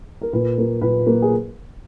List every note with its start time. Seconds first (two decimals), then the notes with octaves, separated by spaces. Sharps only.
0.21 A#4
0.33 A#2 B4
0.58 A#3
0.81 A#2 B4
1.07 A#3
1.22 G#4